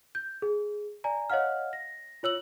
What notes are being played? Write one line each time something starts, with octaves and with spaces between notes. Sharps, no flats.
G6
G#4
D5 G#5 A#5
C#5 D#5 F5 F#5 F6
A#6
F4 C#5 E6 F#7